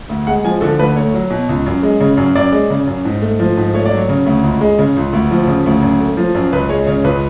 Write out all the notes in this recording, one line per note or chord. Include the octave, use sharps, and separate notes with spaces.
D2
G#3 F#5
F3 G#5
D3 A4
D2 B4
A3 C#5
F#3
B2
C#2
F#2
G#3
C#3
F#2
F#2 D5
G#3
C#3
F#2
G#2
A3
F3
G#2
A3 C#5
D5
F#3
C#5
C#3
D2
C#2
G#3
C#3
C#2
D2
F3
C#3
D2
F#2
A3
F3
F#2
C#2 B4
G#3 C#5
C#3 C#5
C#2 B4